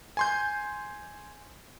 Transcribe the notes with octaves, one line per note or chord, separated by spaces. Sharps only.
G#5 C6 G6